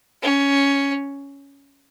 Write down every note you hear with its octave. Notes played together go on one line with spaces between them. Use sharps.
C#4